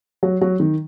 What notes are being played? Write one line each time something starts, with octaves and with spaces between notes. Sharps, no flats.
F#3
F#3
D#3